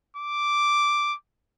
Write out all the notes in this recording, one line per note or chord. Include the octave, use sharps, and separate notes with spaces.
D6